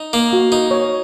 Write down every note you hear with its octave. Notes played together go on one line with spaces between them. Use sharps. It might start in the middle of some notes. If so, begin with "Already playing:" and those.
Already playing: D#4
A#3
F#4
D#4 A#4
C#5